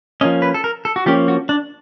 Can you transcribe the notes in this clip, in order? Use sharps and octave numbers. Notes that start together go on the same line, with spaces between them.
F3 A#3 C#4 D#5
B4
A4
A#4
A4
F#4
F3 A#3 C#4 G4
F#4
D4